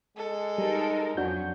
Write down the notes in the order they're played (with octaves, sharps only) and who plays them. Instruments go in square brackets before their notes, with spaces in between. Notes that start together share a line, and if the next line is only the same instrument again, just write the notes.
[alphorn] G#3 [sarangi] A4
[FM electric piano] G3 [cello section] D#4 A#4
[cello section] F2 F#3 C#4 [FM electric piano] D4 F#4 G6